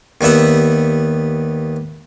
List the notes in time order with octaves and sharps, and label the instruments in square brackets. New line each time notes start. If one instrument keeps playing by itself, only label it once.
[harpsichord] D#2 G3 B3 E5 F#5